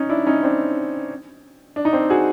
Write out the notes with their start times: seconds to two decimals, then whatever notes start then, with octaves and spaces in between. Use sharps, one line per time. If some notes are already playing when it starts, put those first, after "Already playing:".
Already playing: C#4 D#4
0.09 D4 E4
0.26 C#4 D#4
0.43 C4 D4
1.76 D4
1.85 D#4
1.93 C4 D4
2.10 F#4 G#4